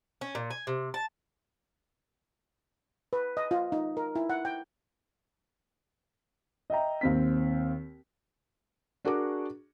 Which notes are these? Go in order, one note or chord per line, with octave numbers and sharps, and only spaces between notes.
C#4
A#2
G#5
C3
A5
B4
D#5
F4
D#4
A#4
E4
F#5
G5
D#5 E5 G5 A#5
D#2 C4 B6
D4 F#4 G#4 A#4 C#6 D6